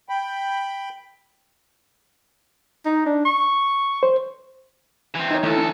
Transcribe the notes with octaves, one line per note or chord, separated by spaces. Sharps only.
G5 B5
D#4
D4
C#6
C5
E3 C4
D#4 C#5
D2 E3 A3 A4
C#4